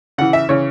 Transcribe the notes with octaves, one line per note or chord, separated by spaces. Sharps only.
C#3 E3 F#5
E5
C#3 E3 C#5